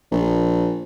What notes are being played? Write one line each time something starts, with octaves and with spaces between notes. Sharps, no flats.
A#1